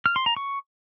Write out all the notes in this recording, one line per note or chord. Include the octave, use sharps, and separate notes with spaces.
F6
C6
A#5
C#6